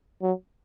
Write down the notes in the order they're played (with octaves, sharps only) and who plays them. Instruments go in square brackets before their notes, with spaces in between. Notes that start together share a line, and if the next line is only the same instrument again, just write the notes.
[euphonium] F#3